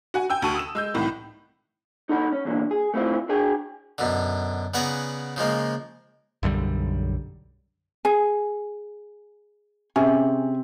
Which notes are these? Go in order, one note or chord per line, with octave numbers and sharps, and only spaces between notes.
F#4 F#5 G#5
G5 G#5 E6
D2 F#4 A5 C#6 D#7
D#6 E6 E7
G#3 E6 G6
C2 A2 D#3 E3
D#4 A4 F#5 A#5 B5
C#4
E2 A#2 D3
G#4
A3 C4 E4 F4
D4 F#4 G#4 G5 G#5
F#2 B2 D3
C#3 B3 D5 F#5 G#5 A#5
C#3 F3 G#3 A#3
B1 F#2 D3 G3
G#4 G#5
C3 C#4 G#4